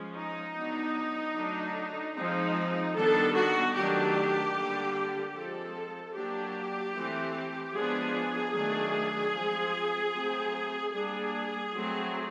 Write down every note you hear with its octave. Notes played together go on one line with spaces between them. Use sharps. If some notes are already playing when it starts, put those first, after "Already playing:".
Already playing: F3 G#3 C#4
D#4
F#3 B3 D4
D3 F#3 A3 D4
F3 G#3 C4 D#4
D#3 G3 B3 D4 A4
F#4
D#3 F#3 A3 D4 G4
D3 G3 A#3 D4
F3 G#3 C4 A4
F#3 A#3 D4 G4
E3 A3 C4
F3 G#3 B3 D4 G#4
D#3 F#3 A3 D4
F3 G#3 C4
F#3 A3 C4
G3 A#3 D4 G#4
F#3 A3 C4